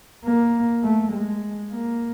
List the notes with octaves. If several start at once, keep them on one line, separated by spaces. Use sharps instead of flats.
A#3
A3
G#3
A#3